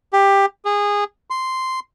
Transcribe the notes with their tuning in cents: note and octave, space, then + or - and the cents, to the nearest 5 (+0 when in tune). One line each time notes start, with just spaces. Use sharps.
G4 +15
G#4 -20
C6 -5